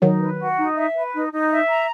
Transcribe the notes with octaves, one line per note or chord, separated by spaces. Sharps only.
D#3 F#3 D#4
B4
F#4
D#4
E5
B4
D#4
D#4
E5
A#5